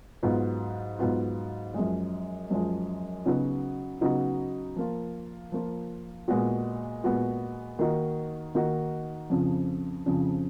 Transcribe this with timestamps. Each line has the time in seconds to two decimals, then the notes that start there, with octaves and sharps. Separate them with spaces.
0.23 G#2 F#3 B3 F4
0.99 G#2 F#3 B3 F4
1.74 F#2 F3 G#3
2.50 F#2 F3 G#3
3.26 C#3 F#3 B3 D#4 F#4
4.01 C#3 F#3 B3 D#4 F#4
4.76 F3 A#3 F4
5.52 F3 A#3 F4
6.28 A#2 G#3 B3 F#4
7.04 A#2 G#3 B3 F#4
7.79 D#3 A#3 D#4 F#4
8.55 D#3 A#3 D#4 F#4
9.30 F2 C#3 F3
10.06 F2 C#3 F3